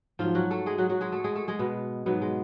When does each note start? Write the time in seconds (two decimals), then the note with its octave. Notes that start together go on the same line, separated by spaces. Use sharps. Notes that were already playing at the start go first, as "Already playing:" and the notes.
0.19 G#2 F3 F#3 F4
0.35 F#3 F#4
0.51 A3 A4
0.66 G#3 G#4
0.78 F#3 F#4
0.89 F#3 F#4
1.01 G#3 G#4
1.12 A3 A4
1.24 G#3 G#4
1.35 A3 A4
1.48 G#3 G#4
1.59 B2 B3
2.06 G#2 B2 F#3 B3
2.22 G#3